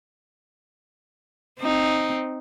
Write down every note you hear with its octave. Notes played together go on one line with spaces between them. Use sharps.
C4 D#4